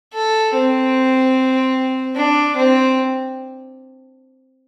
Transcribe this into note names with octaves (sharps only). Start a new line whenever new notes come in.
A4
C4
D4
C4